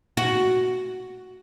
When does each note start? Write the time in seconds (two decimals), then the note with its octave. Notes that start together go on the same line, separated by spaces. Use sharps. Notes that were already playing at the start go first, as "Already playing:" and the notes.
0.17 F#4